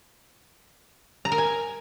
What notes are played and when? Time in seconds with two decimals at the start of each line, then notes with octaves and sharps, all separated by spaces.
1.25 A#5
1.32 A#4
1.38 G#5